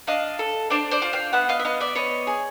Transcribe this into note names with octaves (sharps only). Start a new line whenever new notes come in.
D4 D#5 F5
A4
D4 C5 D5
C5 D5
F4
F5 G5
B3 E5 F#5
D#5 F5
E5
B3 D#5 F5
D5 E5
B3 C#5 D#5
G#4